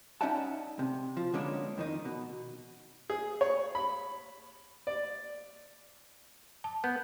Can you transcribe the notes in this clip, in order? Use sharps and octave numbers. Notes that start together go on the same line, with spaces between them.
C#4 D#4 D5 E5 F#5 A5
C3
F3
D3 G#3 A#3 B3 C#4 D4
F2 D#3 D#4
B2
G#4
C#5
B5
D5
A5
B3 G6